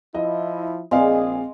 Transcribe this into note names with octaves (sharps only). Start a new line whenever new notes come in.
F3 E4 D#5
A#1 G#3 C4 G#4 D5 F5